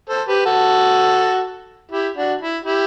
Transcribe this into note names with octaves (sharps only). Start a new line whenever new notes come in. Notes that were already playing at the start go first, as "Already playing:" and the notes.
A4 C5
G4 B4
F#4 A4
E4 G4
D4 F#4
E4
E4 G4